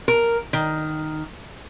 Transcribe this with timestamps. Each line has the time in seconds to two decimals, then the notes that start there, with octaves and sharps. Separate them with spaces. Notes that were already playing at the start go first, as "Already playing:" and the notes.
0.08 A#4
0.53 D#3